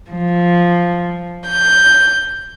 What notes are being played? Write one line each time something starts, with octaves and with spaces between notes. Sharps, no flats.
F3
G6